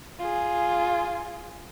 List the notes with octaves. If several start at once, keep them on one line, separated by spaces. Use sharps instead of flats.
F4 G#4